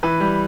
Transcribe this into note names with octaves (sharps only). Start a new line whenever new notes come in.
E3 B4
G3